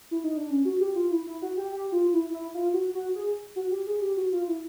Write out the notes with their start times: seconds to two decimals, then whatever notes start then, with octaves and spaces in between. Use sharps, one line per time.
0.11 E4
0.24 D#4
0.37 D4
0.50 C#4
0.65 F#4
0.80 G4
0.95 F4
1.11 E4
1.26 E4
1.42 F#4
1.57 G4
1.72 G4
1.92 F4
2.14 E4
2.33 E4
2.54 F4
2.74 F#4
2.94 F#4
3.15 G#4
3.56 F#4
3.71 G4
3.87 G#4
4.01 G4
4.17 F#4
4.32 F4
4.48 E4